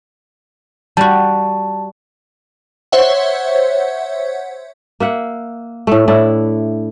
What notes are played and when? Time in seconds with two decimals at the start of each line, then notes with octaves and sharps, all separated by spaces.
0.97 G3 F#4 A5
2.92 C5 C#5 E5 F#5
5.00 A#3 E5 F#5
5.87 A2 A3
6.08 A2 D4 E4